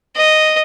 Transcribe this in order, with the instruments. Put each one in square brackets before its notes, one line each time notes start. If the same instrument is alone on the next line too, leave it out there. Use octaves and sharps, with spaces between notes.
[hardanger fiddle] D#5